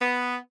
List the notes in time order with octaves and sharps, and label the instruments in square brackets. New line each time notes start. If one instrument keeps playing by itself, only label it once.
[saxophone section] B3